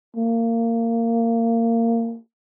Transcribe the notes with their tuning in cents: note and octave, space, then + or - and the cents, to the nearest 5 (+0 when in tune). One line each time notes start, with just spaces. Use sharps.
A#3 -25